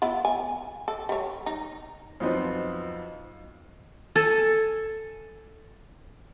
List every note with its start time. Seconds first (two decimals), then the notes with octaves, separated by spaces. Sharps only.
0.02 B3 E4 F4
0.25 G#5
0.88 A4
1.09 G3 C#5
1.46 D#4
2.20 F2 F3 F#3 B3 C4 D#4
4.16 A4 G#5 A5